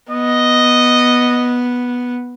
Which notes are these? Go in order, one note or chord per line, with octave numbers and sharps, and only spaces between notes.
B3 D#5